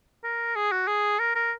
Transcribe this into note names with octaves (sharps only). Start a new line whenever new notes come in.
A#4
G#4
F#4
G#4
A#4
A#4